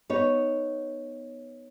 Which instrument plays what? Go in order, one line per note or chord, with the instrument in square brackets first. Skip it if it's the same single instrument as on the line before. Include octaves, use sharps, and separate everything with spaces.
[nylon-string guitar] B3 D#4 C#5